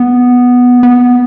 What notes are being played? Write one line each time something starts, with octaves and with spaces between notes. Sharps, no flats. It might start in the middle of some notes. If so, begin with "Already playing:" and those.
Already playing: B3
B3